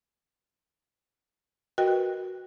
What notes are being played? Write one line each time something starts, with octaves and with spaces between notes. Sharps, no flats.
F#4 A#4 B4 D#5 G5